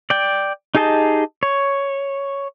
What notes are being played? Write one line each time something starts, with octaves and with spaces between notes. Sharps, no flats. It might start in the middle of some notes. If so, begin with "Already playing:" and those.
D5 G5
D#4 G4 G#4 D#5 A5
C#5